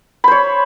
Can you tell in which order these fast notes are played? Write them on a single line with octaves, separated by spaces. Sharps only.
B5 C5 C#5